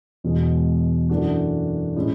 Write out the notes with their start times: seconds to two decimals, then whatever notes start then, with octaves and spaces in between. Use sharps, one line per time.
0.24 E1 E2 B2 G#3
1.09 F#2 E3 A3 D4 F#4
1.96 A2 G#3 C#4 E4